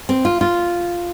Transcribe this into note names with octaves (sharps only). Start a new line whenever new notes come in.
C4
F4
F4